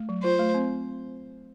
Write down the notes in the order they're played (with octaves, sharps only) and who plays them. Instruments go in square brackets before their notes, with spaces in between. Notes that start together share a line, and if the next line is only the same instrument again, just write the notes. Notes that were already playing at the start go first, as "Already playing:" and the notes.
Already playing: [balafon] A3
F#3
[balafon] F4 [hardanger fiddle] C5
[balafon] A3
C4